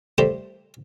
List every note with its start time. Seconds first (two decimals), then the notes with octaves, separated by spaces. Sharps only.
0.18 G3 A3 A#3 E4 G4 C5